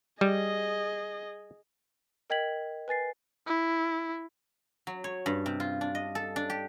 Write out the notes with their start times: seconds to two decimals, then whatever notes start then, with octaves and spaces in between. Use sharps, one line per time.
0.21 G3 G#4 D#5
2.30 A#4 D#5 G5 G#6 B6 F#7
2.88 B4 G#5 A6 C7
3.47 E4
4.87 F#3
5.04 C#5
5.26 G2
5.46 C3
5.60 F4
5.81 D4
5.95 D#5
6.15 A4
6.36 D4
6.50 G4